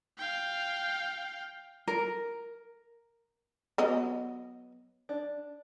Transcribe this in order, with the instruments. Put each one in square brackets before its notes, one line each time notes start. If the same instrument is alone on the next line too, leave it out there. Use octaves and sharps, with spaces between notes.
[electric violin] F5 G5
[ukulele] A#4
[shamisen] F#3 B3 D#5
[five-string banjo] D4